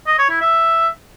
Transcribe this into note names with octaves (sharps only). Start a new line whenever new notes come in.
D#5
C#5
E4
E5